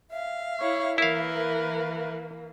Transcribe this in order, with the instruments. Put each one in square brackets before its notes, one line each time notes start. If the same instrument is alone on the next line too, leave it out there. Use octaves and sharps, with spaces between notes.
[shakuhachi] E5 [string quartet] F5
[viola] E4 C#5
[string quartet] E3 A#3 [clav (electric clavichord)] E4 F5 [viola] A#4 B4